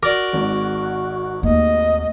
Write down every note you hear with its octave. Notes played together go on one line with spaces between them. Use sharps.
F#4 A#4 D5 D6
G#1 G#2
D#2 A3 D#5